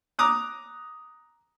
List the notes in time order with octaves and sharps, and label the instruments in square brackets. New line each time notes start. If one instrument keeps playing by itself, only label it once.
[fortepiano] A#5 D6 D#6 F#6